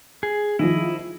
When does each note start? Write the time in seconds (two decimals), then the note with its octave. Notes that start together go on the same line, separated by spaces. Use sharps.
0.23 G#4
0.59 D#3 F3 E4 D#5